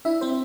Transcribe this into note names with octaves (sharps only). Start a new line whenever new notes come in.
D4 E4 E5
C4 C5